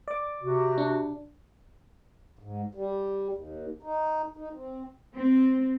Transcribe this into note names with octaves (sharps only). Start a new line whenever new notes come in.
D5 D6
C3 F#4
D4
G#2
G3
D#2
D#4
D#4
C4
C4